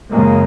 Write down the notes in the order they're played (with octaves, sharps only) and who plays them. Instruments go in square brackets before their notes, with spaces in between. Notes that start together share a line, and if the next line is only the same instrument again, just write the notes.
[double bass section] F#2 C#3 G#3 A#3